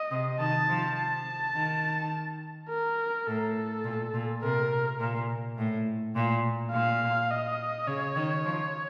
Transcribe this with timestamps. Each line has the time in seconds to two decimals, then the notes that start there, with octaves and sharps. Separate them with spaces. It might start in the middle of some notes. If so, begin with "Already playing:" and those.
Already playing: D#5
0.11 C3
0.39 D#3 A5
0.68 F3
0.97 A5
1.55 D#3
2.69 A#4
3.27 A2 A4
3.84 A#2
4.14 A#2
4.42 C3 A#4
5.00 A#2
5.58 A2
6.16 A#2
6.72 A#2 F5
7.30 D#5
7.87 C#3 C#5
8.16 D#3
8.45 F3